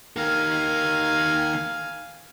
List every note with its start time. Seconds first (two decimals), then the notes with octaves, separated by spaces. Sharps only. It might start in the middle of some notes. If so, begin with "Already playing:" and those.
0.16 D#3 A#3 F5 G#5